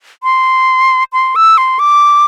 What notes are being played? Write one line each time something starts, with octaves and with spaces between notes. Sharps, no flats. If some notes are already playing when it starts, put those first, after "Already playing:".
C6
C6
E6
C6
D6